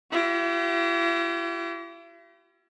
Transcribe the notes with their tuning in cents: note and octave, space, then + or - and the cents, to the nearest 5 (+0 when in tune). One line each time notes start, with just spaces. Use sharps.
E4 +45 G4 -40